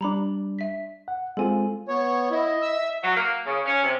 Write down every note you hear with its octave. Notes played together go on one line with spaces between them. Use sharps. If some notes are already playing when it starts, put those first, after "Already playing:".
G3 D4 A#5 B5 D6
E5 B6
F#5
G#3 C4 F4 A4 G#5
B3 C#5
E4 D#5
E5 E6
F#3
A#3
C#3
C#4
C3